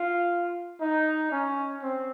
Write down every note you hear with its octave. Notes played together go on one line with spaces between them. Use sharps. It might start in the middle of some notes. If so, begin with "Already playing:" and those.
Already playing: F4
D#4
C#4
C4